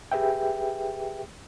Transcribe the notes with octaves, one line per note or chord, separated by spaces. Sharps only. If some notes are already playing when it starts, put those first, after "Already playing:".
G4 G#4 B4 E5 G5